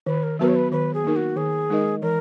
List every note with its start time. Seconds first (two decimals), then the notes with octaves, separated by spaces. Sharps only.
0.07 D#3 B4
0.23 A#4
0.39 F#3 B3 F#4 A#4 B4
0.48 C#5
0.56 B4
0.72 D#3 B4
0.94 G#4
1.04 A#3 D#4 A#4
1.16 F#4
1.36 D#3 G#4
1.70 G#3 D#4 A#4 D#5
2.02 E3 A#4